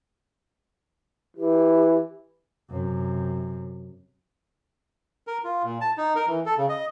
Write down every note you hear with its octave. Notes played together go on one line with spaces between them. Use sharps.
E3 G4
F#2 C3
A#4
F4
A#2
A5
D#4
A#4
E3
A4
C#3
D#5